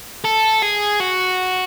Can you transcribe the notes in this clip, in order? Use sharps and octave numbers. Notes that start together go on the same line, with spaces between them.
A4
G#4
F#4